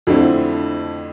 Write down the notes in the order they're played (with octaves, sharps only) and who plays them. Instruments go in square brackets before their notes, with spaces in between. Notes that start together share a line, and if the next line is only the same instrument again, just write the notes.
[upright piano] F2 D3 A3 C4 E4